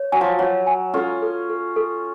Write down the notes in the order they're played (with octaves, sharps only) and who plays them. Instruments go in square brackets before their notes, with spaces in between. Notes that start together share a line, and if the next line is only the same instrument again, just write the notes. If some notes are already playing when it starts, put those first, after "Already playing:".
Already playing: [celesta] C#5
[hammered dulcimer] F#3 [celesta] G#5
[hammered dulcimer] F3
[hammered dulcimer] F#3 [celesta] C#5
[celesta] G#5
[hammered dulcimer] C#4 F4 [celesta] A4
[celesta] A4
A4
A4